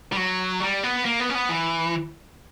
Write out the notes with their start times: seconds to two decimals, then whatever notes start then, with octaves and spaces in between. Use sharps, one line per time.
0.12 G3
0.17 F#3
0.60 G3
0.83 B3
1.05 A#3
1.20 B3
1.30 C#4
1.35 B3
1.49 E3